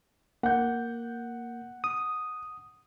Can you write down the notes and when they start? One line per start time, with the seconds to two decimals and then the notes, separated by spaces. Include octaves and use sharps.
0.43 A#3 F#5 G6
1.84 D#6